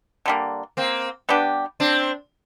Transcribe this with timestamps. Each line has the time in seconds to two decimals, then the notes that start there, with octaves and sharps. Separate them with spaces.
0.26 D3 G3 A#3
0.77 A#3 C4
1.29 G3 B3 D4 G4
1.80 C4 D4